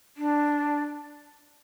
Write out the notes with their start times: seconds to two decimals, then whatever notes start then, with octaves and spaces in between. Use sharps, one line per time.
0.17 D4